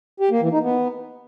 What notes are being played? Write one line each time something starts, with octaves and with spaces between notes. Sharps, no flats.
G4
A#3
E3
D#4
B3